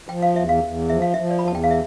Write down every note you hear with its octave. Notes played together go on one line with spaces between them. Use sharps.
F3 G5
F5
E2 E5
F5
E2
F3 E5
F5
F3 E5
D5
B5
E2 A5
G5
F5
E5